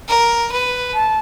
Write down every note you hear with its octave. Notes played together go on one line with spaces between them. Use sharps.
A#4
B4
A5